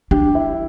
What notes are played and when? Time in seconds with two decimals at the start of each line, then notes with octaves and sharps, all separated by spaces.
0.11 D4 G4
0.35 E4